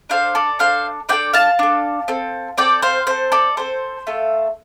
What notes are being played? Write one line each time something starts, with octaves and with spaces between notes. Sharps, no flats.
D4 A4 C5 F5
A4 D5
D4 A4 C5 F5
D4 A4 D5 G5
F5 A5
D4 A4
C4 A4
C4 A4 D5 G5
C5 F5
C4 A4 C5
A4 D5
C4 A4 C5
A3 F4 A4